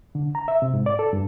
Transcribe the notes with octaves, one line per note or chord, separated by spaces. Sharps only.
D3
A#5
E5
C3
G#2
D5
A4
G2